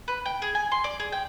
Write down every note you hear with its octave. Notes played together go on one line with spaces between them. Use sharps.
B4
G5
G#4
G#5
C6
D5
G#4
G5